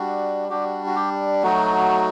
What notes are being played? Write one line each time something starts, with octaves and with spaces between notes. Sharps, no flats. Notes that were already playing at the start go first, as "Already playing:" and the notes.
Already playing: G3 D4 F#4
G3 D4 F#4 G4
F#4
G4
F#3 A3 D#4 F#4